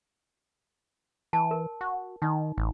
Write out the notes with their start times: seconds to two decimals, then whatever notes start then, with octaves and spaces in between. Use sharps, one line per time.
1.33 E3 A5
1.51 A#4
1.81 F#4
2.22 D#3 D#4
2.58 A1